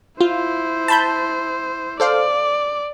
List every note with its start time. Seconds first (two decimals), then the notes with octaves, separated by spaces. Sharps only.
0.21 E4 F4 C5
0.88 A5 B5 G6
2.00 A4 C5 D5 F5